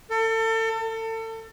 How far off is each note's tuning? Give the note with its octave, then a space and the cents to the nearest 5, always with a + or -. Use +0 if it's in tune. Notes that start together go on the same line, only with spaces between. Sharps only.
A4 +35
A4 +30